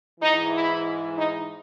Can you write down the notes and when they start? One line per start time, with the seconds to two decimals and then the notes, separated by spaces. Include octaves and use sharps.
0.20 G#2 E3 D#4
0.52 E4
1.16 D#4